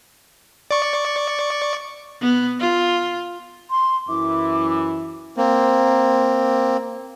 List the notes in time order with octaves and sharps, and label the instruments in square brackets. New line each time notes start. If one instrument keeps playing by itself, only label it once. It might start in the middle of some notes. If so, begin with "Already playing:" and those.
[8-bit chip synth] D5 C#6
[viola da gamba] B3
F4
[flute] C6
[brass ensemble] F#2 E3 E4 [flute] D6
[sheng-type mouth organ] A#3 C4